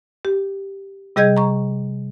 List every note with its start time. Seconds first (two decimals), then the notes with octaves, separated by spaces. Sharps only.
0.25 G4
1.16 C3 G3 G#4 D#5 G6 G#6
1.37 A#5 C#6